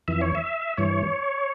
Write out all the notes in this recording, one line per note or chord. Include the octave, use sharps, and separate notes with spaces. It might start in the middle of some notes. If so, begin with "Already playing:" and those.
F2 E3 E5
C#5
E5
G2 E3 C#5